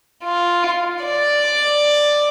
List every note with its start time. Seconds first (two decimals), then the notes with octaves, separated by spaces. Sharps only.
0.24 F4
1.04 D5